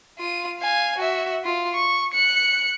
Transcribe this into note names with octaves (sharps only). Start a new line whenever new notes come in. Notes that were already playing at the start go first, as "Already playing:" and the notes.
F4 D#7
F5 G#5
F#4 E5
F4
C#6
F#6 C#7